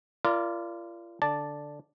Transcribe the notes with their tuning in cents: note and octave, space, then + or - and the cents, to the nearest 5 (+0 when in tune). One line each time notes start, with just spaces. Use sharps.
F4 -35 A#4 +5 D5 -5
D3 +0 D5 +5 A5 +0